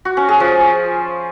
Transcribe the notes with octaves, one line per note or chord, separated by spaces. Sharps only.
F#4
C#4
G#4
F3